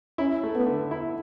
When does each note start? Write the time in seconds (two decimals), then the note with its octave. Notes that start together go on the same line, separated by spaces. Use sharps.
0.18 C#4 E4
0.43 A3
0.55 B3
0.67 D3
0.91 E4